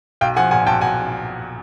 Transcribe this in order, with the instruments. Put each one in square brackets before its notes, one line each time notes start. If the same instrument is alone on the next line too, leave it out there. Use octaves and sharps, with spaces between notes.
[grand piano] B1 F5 G5
F3 F#5 G#5
A#2 F#5 G#5
B1 G5 A5
B1 F#5 G#5